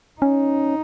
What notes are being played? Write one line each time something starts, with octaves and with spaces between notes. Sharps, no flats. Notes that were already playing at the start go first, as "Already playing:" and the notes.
C#4 D#4